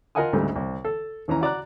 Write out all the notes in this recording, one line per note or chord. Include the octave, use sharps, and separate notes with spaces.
F4 A#4 D#5 F#5 G#5 D#6
D2 G#2 C#3 G3 A3
C2
A4
D#2 E3 C#4 A#5
F#4 D5 A#5 F#6